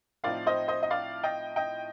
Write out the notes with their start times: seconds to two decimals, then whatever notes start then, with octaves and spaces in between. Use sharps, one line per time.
0.24 A2 F3 C4 D#4 D5 F5
0.46 C5 D#5
0.68 C5 D#5
0.83 D#5
0.90 D5 F5
1.23 D#5 G5
1.56 D#5 G5